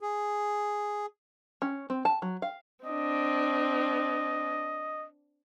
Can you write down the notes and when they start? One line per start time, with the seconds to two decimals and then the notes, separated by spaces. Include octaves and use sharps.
0.01 G#4
1.62 C#4
1.90 C4
2.05 A5
2.22 F#3
2.42 F5
2.85 C4 D4 D#5